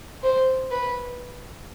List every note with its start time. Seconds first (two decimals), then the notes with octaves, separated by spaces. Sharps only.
0.23 C5
0.71 B4